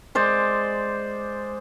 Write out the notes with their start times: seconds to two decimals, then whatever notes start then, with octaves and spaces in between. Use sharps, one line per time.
0.15 G#3 C5 D5